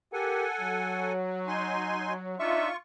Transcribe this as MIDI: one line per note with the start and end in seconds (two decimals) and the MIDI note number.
0.13 0.45 67
0.13 1.13 69
0.13 0.45 70
0.13 1.13 78
0.13 1.13 80
0.61 2.37 54
1.47 2.13 63
1.47 2.13 80
1.47 2.13 84
2.39 2.69 62
2.39 2.69 63
2.39 2.76 65
2.39 2.69 76
2.39 2.76 85